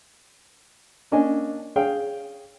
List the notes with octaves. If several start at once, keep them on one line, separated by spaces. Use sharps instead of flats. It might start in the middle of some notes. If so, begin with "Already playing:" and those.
A#3 C#4 D4 D#5 G#5
G#4 C#5 F5 G5